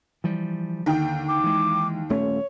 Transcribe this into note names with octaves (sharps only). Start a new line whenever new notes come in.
E3 F3 G3
D#2 D3 G5
D6
E3 G#3
D#1 A3 C#4 C#5